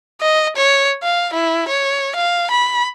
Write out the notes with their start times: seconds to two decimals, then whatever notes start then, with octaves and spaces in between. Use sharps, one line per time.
0.21 D#5
0.56 C#5
1.03 F5
1.33 E4
1.68 C#5
2.15 F5
2.51 B5